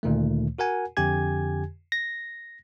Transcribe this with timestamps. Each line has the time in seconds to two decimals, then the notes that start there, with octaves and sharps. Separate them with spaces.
0.03 D2 A#2 D#3 A3
0.59 F#4 A#4 F#5 G#5
0.97 F2 D3 G4 G#5 G#6
1.92 A#6